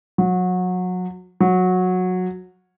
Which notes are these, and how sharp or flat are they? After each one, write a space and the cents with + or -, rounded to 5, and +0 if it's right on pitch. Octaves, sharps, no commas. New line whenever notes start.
F#3 -25
F#3 -15